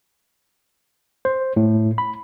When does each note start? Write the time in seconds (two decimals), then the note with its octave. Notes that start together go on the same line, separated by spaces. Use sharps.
1.25 C5
1.56 A2
1.98 B5